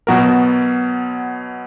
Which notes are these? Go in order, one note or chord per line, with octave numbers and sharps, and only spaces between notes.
B2 F#3 B3 F#4 A#4